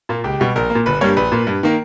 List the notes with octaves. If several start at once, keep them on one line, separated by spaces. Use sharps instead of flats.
A#2 A#3
C#2 G4
B2 G3
A#1 A#4
A#3
A#2
G1 B4
G2 G3 A#3 C#5
A#1 B4
A#2 A#3
G2
D#3 A#3